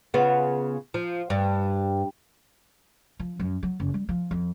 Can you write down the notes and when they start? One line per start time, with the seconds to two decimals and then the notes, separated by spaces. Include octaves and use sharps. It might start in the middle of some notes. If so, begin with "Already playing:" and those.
0.14 C#3 B3 F4
0.94 F3
1.30 G2
3.20 F3
3.40 F#2
3.63 F#3
3.80 F#1
3.94 G3
4.09 F3
4.31 F2